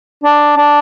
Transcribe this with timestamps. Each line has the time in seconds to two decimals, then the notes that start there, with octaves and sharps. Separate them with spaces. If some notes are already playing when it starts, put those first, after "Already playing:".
0.24 D4
0.57 D4